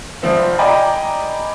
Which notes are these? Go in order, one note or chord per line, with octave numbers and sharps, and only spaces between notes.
F1 F3 C4 E5
D5 D#5 G5 G#5 A#5 B5